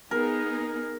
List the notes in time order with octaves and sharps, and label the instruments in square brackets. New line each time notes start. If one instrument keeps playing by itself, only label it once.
[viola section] B3 D#4 G#4 [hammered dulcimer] A#4